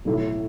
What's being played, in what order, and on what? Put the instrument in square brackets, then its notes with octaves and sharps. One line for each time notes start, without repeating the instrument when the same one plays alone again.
[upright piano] B1 A2 F#3 A3 E4